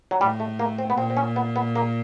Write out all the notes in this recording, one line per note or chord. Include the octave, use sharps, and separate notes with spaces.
F#3
A2 G3
A3
A#3
C4
B3
A#2 C4
C4
C#4
B3
B3
A#3